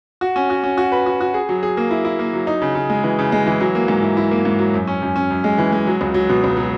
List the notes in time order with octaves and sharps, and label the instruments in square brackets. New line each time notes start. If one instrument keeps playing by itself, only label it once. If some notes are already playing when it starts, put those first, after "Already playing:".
[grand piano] F#4
C#4
F#4
C#4
F#4
B4
F#4
F#4
G#4
F#3
G#4
A#3
E4
E4
A#3
F#3
D#4
C#3
C#3
G#3
E3
C#3
G#3
E3
F#3
A#3
G#2
E4
E4
A#3
G#2
F#3
F#2
C#4
F#2
C#4
F#2
G#3
E3
G#3
F#3
C#2
F#3
B2
C#2
F#3